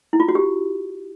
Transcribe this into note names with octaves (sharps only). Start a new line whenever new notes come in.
E4
F4
F#4
G4